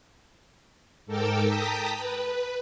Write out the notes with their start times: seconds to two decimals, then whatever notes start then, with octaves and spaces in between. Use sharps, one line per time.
1.06 G#2 A4 A#4 G5 D6 E6
1.47 G5 A5 A#5 D#6 B6
1.97 B4